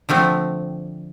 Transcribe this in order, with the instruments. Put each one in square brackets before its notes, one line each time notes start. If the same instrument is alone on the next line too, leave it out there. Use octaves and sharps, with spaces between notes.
[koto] D3 F3 A3 C4